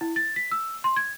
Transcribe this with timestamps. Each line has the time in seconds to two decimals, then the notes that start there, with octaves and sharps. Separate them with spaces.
0.01 E4
0.16 A6
0.36 B6
0.51 E6
0.84 C6
0.96 G#6